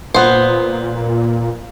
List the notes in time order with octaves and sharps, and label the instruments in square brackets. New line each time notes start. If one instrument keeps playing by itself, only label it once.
[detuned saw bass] A#2 [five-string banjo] B3 C5